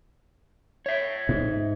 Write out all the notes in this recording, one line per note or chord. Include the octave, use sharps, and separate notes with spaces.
C#5 E5
G#2